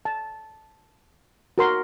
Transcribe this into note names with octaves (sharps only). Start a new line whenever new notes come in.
A5
F#4 A#4 C6